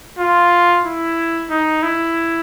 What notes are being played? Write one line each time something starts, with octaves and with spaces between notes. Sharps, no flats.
F4
E4
D#4
E4